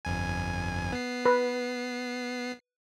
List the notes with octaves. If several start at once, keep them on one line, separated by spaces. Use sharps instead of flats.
G1 F2 G#5
B3 C7
B4